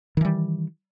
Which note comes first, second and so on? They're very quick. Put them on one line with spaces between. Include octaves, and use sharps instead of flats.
D#3 E3 G3